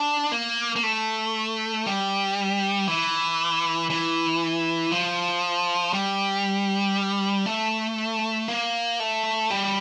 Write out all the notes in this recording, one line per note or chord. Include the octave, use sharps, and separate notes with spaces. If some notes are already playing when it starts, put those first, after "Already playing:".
Already playing: D4
A#3
A#3
A3
G3
E3
E3
F3
G3
A3
A#3
A3
G3